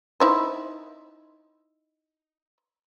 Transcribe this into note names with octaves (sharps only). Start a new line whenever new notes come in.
D#4 E4 C5